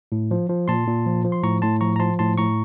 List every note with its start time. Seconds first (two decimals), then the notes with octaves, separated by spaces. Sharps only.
0.12 A2
0.31 F3
0.49 F3
0.68 A#2 A5 C6
0.87 A#2
1.06 F3
1.25 F3
1.32 C6
1.43 A2 A#5 C#6
1.62 A2 A5 C6
1.81 F3 A#5 C#6
1.96 A#5
1.99 F3 A5 C6
2.19 A2 A5 C6
2.38 A2 A#5 C#6